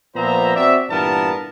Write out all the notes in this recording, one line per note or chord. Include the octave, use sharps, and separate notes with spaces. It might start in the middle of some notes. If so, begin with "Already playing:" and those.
A#2 F3 B3 C5 E5 A#5
C4 F#4 D5 E5
G2 A#2 E3 B3 A#4 A5